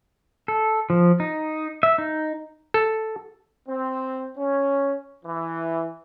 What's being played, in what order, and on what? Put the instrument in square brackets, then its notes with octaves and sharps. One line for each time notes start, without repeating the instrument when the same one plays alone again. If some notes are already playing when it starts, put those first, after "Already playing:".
[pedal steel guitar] A4
F3
D#4
E5
D#4
[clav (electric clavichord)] A4
[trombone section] C4
C#4
E3